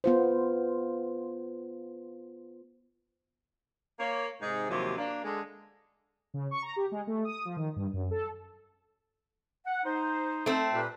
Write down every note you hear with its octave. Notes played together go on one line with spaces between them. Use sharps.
B3 F4 C5
A#3 C#5
G#2 C3 D#4 G#4
D#2 C3 F3 F#3
A#3 D4
D3 G#3
C#3
C#6
A#5
G4
G#3
A3
D#6
F3
D#3
G2
F#2
A4
F#5
D#4 C5
A3 C4
A#2 G4 B4